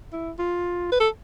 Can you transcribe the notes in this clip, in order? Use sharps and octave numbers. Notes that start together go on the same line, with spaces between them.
E4
F4
B4
A4